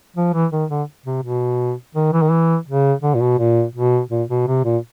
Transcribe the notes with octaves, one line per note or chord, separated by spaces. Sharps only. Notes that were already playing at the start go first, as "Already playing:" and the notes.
F3
E3
D#3
D3
C3
B2
D#3
E3
D#3
E3
C#3
D3
A#2
B2
A#2
B2
A#2
B2
C3
A#2